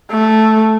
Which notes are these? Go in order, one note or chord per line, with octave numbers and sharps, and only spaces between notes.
A3